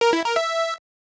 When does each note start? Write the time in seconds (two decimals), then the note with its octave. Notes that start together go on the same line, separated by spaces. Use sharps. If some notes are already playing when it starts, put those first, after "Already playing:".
0.01 A#4
0.13 E4
0.25 A#4
0.36 E5